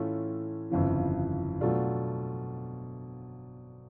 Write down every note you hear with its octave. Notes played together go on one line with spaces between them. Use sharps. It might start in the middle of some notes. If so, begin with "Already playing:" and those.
Already playing: A2 E3 A3 C#4 F4
G1 F2 C#3 E3
B2 F#3 A3 D4 F4